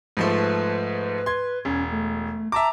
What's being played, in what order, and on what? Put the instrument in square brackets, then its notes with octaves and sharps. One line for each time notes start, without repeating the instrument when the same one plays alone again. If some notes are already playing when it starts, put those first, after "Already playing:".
[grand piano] G#2 F3 A3 [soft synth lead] B4
[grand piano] C6 G#6
[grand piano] E1 [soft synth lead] C#4
[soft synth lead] A3
[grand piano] E5 A5 D6 [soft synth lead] A#5